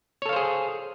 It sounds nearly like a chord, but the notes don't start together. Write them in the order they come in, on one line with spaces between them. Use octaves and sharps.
C#5 A4 F5 C5 G#4